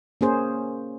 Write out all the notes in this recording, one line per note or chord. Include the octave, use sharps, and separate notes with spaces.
A#3 C#4 G#4 C5